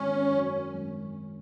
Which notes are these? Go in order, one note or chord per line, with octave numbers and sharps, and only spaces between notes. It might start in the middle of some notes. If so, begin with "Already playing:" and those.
Already playing: G#1 C#4
F#2
G#1